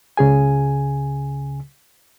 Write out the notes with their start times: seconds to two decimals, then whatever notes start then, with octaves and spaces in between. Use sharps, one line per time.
0.17 C#2 C#3 G#4 G#5